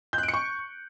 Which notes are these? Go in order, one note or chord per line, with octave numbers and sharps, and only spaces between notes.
G6
F#6
D7
C#7
C#6